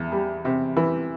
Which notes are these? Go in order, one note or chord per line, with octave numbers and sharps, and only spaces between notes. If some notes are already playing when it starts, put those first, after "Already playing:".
Already playing: E2
G3
C3
E3